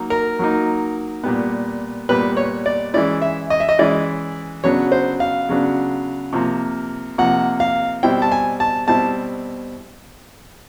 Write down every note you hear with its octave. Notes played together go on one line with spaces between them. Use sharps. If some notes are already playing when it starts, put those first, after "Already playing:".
Already playing: F#3 A#3 D#4
A#4
F#3 A#3 D#4
A#2 G3 B3
A#2 G3 B3 B4
C#5
D5
E3 G#3 C#4 E4 D5
E5
D#5
E5
D#5
E3 G#3 C#4 E4 D5
C#3 F#3 B3 D4 C#5
C5
F5
C#3 F#3 B3 D4
C3 F3 A#3
C3 F3 A#3 F#5
F5
B2 G3 C4 E4 G5
A5
G#5
A5
B2 G3 C4 E4 A5